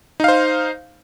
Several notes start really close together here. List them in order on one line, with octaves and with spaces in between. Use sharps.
D#4 F5 C5